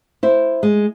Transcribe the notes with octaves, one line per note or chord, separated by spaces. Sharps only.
E4 C5
G#3